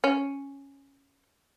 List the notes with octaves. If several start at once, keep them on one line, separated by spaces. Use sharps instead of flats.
C#4